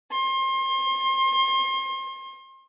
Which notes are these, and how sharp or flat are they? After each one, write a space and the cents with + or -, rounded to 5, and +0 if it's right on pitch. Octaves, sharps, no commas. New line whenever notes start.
C6 +35